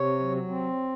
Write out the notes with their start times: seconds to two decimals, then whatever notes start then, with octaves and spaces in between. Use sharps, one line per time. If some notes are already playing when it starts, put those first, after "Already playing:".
Already playing: C3 C#5
0.19 F#3
0.48 C4